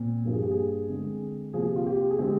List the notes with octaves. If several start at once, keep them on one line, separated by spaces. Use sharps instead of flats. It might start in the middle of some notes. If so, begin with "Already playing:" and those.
Already playing: A#2 C4
G2 F3 A#3 A#4
G#4
G4
G#4
D3 G#3 C4
C3 F3 A#3 G#4
G4
F4
G4
G#4
D3 G#3 C4 G4